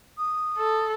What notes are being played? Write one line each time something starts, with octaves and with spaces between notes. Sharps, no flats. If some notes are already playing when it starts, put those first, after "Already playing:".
D#6
A4